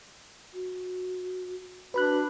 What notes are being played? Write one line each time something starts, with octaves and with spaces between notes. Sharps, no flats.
F#4
D4 F#4 B4 B5 F#6